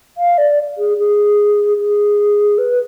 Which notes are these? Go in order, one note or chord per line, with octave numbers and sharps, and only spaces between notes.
F5
D5
G#4
G#4
G#4
B4